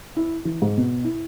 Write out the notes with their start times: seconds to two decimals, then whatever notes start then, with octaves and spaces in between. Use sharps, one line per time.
0.17 E4
0.45 E3
0.62 G#2
0.77 B2
1.05 E4